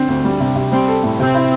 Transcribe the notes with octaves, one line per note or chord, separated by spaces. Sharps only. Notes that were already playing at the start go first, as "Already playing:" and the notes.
Already playing: D3 C4
D2
G3
C3
C3
G3 C4
A4
A2
C3 C4
E4